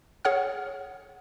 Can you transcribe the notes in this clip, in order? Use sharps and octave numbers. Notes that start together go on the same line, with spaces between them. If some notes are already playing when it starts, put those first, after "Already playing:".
G#4 C#5 F#5 F6